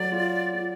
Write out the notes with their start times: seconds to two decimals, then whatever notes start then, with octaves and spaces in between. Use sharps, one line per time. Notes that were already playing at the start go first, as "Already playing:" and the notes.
Already playing: F#3 A3 D5
0.12 F4
0.53 F4